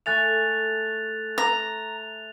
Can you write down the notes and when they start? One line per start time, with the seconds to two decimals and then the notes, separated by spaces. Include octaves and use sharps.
0.06 A3 G#5 C#6 F#6 A6 F7
1.38 A#5 F7